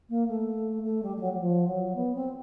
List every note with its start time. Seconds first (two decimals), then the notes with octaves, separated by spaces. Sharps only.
0.09 A#3
0.28 A3
0.83 A3
1.02 G3
1.16 G3
1.20 F#3
1.33 F#3
1.39 F3
1.67 F#3
1.95 B3
2.14 C4